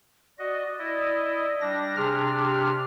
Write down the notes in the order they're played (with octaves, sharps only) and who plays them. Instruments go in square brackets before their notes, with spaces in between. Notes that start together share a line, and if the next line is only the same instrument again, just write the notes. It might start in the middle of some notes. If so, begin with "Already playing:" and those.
[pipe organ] F#4 D#5 [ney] D5
[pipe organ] E4 D#5
G3 D4 A#6
[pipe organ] C3 D4 F6 [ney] G#4
[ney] G4